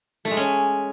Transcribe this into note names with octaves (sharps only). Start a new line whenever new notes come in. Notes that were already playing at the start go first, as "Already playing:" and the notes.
A3
G#3
C#4